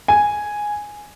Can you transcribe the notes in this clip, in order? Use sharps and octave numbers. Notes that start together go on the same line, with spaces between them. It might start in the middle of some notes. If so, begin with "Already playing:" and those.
G#5